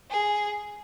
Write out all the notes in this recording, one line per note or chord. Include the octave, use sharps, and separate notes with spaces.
G#4